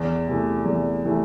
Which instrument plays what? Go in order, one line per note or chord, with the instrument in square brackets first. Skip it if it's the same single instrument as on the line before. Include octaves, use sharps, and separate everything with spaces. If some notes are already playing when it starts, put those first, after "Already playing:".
Already playing: [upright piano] E2
C3 E3 A3
E2
C3 E3 A3